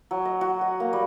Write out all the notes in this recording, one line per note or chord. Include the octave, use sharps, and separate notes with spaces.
F#3
D#5
F#4
D#5
A#3
G3